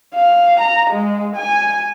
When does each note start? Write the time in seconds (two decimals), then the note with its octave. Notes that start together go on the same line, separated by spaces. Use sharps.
0.15 F5
0.60 A#5
0.90 G#3
1.36 G#5